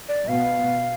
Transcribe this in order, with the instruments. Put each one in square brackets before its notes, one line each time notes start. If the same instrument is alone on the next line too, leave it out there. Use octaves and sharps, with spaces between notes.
[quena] D5
[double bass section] B2 B3 [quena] F5